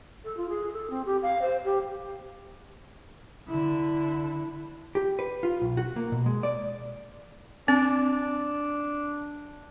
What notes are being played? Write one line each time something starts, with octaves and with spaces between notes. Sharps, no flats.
A4
F4
G#4
A4
C4
G4
F5
C5
G4
D3 E4
G4
B4
F4
B1
F#4
A#3
B2
G#3
D5
C4 D4